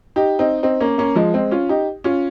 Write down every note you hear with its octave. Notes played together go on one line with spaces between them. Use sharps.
D#4 G4
C4 D#4
C4 D#4
A#3 C#4
A#3 C#4
F3 G#3
G#3 C4
C#4 F4
D#4 G4
C#4 F4